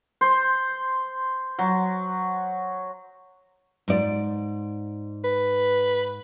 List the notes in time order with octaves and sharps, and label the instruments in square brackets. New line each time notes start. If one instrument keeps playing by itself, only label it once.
[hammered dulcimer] C5
F#3
[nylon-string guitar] G#2 D5
[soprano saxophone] B4